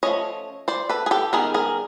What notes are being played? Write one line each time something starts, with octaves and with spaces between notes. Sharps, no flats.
F3 A3 C#4 C#5 D#5
C5 D5
A4 B4
G#4
G4 A4
D#3 G3 B3 G#4 A#4
G#4 A#4